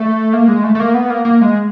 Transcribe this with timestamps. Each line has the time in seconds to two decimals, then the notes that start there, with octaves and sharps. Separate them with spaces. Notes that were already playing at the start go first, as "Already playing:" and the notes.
Already playing: A3
0.33 A#3
0.48 G#3
0.63 A3
0.75 A3
0.80 A#3
0.94 B3
1.10 A#3
1.25 A#3
1.41 G#3